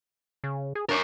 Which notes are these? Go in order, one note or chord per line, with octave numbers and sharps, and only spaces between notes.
C#3
G#4
D4 A#4 C#5